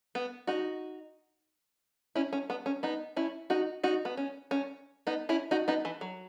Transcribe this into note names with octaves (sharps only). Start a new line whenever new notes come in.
B3
D#4 F#4
C#4 E4
C#4
B3
C#4
B3 D#4
C#4 E4
D#4 F#4
D#4 F#4
B3
C#4
C#4
B3 D#4
C#4 E4
D#4 F#4
B3 D#4
E3
F#3